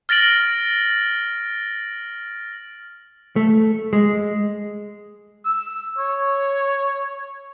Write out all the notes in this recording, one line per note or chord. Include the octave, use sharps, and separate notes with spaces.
F6 A6 A#6 D7 F#7
A3
G#3
E6
C#5